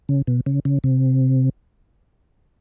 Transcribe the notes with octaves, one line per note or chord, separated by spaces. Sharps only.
C#3
B2
C#3
C#3
C3